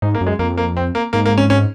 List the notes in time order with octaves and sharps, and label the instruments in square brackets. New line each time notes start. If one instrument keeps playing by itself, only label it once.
[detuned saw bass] G#2 [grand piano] D#4
[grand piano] A#3
[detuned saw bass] F#2
[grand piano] G#3
[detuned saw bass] F2 [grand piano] A#3
[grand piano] A#3
C4
A#3
[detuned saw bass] G#2 [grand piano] A#3
[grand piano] A#3
C#4
C#4